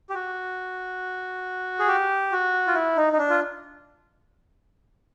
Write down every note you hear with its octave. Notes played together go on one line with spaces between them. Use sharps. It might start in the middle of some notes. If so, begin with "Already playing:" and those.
G4
F#4
G#4
G4
F#4
F4
E4
D#4
D#4
D4
F4